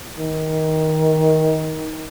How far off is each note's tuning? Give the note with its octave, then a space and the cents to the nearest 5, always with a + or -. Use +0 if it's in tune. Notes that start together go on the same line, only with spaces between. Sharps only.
D#3 +20